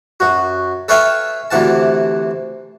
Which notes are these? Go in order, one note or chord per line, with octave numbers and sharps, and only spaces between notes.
F#2 F#4
A4 B4 C#5 E5 F5 G5
D2 C3 E3 F#5 A5